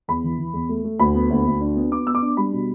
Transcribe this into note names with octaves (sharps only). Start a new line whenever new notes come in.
E2 B5
E3
E3
E2
A3
A3
D2 B5
B3
D2
D2
D4
B3
B3 D6
B3 E6
D6
D4
G3 B5
B2